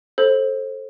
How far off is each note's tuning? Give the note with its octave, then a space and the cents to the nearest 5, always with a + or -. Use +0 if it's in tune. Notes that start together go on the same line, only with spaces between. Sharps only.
A4 -5 C5 +25